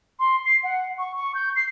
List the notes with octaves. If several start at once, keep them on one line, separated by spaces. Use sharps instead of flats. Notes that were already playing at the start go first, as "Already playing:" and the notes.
C6
C7
F#5
C#6
C#6
G6
C7